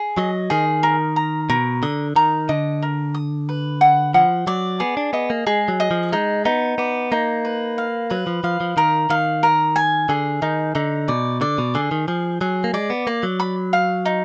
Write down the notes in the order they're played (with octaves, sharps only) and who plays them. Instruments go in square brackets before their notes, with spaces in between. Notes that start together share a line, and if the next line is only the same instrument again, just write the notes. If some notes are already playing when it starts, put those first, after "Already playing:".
Already playing: [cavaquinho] G#4
[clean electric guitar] F#3 [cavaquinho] D#5
[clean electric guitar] D#3 [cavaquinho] G#4
[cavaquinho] A#4
A#5
[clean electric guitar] B2 [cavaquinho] A#4
[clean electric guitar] D3 [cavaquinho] D#6
[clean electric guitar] D#3 [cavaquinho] A#5
[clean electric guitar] D3 [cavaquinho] D#5
[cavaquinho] A#4
D#6
B4
F#5
[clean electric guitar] F3 [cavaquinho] F#5
[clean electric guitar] F#3 [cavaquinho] D5
[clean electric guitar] B3 [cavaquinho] G#4
[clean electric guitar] D4
[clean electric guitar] B3 [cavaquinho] D#5
[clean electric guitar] A#3
[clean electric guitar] G#3 [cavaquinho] G#4
[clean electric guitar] F#3
[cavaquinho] D#5
[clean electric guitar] F3
[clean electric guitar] G#3 [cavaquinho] D#4
[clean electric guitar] B3 [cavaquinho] D#4
[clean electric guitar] B3 [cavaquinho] D5
[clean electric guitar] A#3 [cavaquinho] D#4
[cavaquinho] B4
F5
[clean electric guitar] F#3 [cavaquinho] B4
[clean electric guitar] F3
[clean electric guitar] F3 [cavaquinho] F5
[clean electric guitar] F3
[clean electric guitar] D#3 [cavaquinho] A#4
[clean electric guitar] D#3 [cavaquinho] F5
[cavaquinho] A#4
G#5
[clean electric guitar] D3 [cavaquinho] G#4
[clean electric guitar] D#3 [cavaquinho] D#4
[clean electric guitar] D3 [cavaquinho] D#4
[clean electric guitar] B2 [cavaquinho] D5
[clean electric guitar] D3 [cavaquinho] D5
[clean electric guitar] B2
[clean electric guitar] D3 [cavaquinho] G#4
[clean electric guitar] D#3
[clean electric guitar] F3 [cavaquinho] G#4
[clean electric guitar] F#3 [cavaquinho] G#4
[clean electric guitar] A#3
[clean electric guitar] G#3 [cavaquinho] D5
[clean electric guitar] B3
[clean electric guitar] A#3 [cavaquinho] D5
[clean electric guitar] F#3
[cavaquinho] B5
F5
D#4